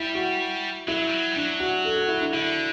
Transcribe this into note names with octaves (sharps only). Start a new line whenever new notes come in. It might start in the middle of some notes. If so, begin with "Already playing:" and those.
Already playing: G3 E4
F#4
F#3 E4
G3
F#3
G3
F#3 D4
F#4
A4
F#4
E4
D4
D3 E4